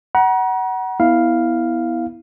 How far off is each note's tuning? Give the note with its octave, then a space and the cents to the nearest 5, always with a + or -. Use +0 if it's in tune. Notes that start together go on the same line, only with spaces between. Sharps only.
F#5 +20 A#5 +40
B3 +0 E4 -15 F5 +0